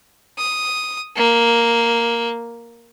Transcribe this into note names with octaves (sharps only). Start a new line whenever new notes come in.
D#6
A#3